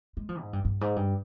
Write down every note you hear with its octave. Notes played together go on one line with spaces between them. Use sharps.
G#3
F3
G#2
G2
G2
G#2
G2